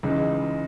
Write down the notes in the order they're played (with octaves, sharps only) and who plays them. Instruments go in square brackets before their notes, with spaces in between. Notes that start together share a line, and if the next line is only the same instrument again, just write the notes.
[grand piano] C#2 C#3 E3 G#3 D#4